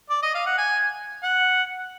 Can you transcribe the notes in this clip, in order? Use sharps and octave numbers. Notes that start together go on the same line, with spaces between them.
D5
D#5
F5
F#5
G#5
F#5